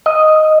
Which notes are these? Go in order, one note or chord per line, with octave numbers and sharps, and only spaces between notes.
D#5